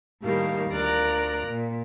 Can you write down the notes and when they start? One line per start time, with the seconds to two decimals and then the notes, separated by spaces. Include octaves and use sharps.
0.23 A2 D#3 G3 A#3 F5
0.71 D2 F4 A#4 D5 A#5 F#6
1.47 A#2